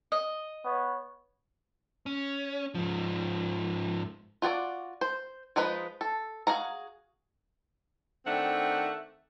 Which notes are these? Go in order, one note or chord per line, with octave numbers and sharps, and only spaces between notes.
D#5
B3 C#5
C#4
G#2 F3
F4 F#4 G#4 D5
C5
F3 G#3 D#4 B4
A4
F#4 G#4 F5 A#5
D#3 A3 C4 D4 F#5